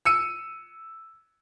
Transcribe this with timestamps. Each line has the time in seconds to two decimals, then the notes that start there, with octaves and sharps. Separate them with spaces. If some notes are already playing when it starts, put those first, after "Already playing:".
0.05 E6 C#7 D#7